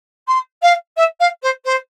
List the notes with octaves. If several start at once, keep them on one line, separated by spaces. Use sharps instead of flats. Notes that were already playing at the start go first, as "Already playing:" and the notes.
C6
F5
E5
F5
C5
C5